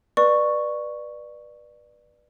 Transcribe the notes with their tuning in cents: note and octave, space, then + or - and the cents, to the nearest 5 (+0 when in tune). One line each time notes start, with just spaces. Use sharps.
B4 -20 D5 +20 C#6 +0